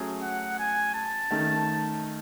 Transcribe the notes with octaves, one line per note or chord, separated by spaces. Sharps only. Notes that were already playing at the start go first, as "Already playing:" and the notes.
Already playing: F#3 A3 C#4 G#4
F#5
G#5
A5
D#3 A3 C#4